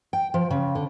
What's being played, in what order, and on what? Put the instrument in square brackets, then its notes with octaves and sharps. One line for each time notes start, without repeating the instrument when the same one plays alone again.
[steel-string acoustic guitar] G5
F3
C#3
D3